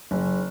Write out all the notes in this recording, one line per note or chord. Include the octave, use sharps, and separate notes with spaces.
F#1